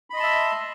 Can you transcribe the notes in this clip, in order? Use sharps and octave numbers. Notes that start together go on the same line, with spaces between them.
D#5 E5 A5 B5 C6